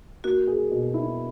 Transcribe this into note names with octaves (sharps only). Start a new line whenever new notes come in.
A#3 F#4
G#4
B2
E4